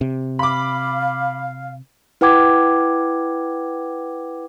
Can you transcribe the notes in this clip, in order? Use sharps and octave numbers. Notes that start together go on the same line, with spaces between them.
C3
F5 B5 D6
E4 B4 F#5 G5 D6 G#6